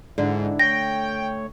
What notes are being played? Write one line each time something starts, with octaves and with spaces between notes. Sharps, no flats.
G#2 D3 D4 E4
A3 C#5 G5 A#6